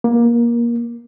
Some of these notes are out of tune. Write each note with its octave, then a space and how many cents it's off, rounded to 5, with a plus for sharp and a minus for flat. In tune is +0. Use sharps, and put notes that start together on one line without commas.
A#3 +20